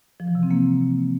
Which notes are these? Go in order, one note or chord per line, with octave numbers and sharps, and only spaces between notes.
F3
E3
C3
C4
A#3